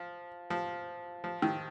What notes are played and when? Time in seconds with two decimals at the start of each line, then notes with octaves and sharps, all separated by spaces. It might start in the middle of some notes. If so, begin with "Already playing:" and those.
Already playing: F3
0.50 F3
1.24 F3
1.42 D#3